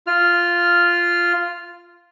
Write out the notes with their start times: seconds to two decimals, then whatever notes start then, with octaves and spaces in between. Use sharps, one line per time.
0.07 F4 F6